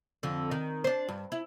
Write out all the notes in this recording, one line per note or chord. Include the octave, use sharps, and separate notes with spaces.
F2 D3
D#3
D4 C5
G2
E4